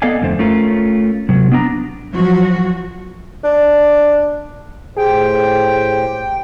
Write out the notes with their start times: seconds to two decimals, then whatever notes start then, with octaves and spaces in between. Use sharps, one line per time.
0.02 B3 A4 D5 D#5 F5 G#5
0.22 F2 D3 A3 C5
0.39 A3 C#4 F4 A#4
1.29 C3 F#3
1.52 B3 D4 A#5
2.13 F3 F#3 F#4
3.44 D4
4.97 A2 G4 G#4 C5 G5